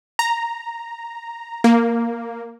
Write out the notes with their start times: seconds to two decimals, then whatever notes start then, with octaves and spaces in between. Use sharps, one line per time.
0.19 A#5
1.64 A#3